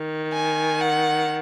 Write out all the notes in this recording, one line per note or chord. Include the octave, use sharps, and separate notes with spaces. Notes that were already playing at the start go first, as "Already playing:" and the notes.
Already playing: D#3
G#5
F#5